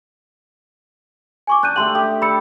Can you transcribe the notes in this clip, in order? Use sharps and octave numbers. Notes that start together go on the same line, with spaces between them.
G#5 C#6 D6
D4 F#6 G6 D#7
A3 G4 G5 C6 F#7
G4 D#6
D5 B5 E6 C#7